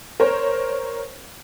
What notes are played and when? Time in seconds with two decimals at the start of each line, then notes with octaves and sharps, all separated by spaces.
0.20 A#4 C5 C#5